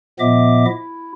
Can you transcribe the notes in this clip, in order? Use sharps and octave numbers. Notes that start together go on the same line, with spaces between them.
A#2 F3 B3 D#5 E5 D6
E4